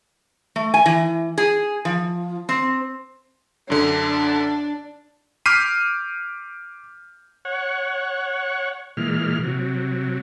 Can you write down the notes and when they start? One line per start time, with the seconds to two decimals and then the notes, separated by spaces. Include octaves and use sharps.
0.56 A3
0.74 G#5
0.86 E3
1.38 G#4
1.85 F3
2.49 C4
3.70 F#2 D3 D4
5.46 D6 F6 G6 B6 C7 D#7
7.45 C#5 F#5
8.97 A#2 E3 G#3 F6
9.43 C3 F#3